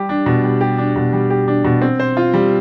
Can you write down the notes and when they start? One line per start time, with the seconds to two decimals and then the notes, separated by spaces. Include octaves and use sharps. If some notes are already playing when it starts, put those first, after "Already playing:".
Already playing: G3 G4
0.09 D4
0.26 B2
0.44 G3
0.61 G4
0.78 D4
0.96 B2
1.13 G3
1.30 G4
1.48 D4
1.64 B2
1.82 C4
1.99 C5
2.17 F4
2.34 G3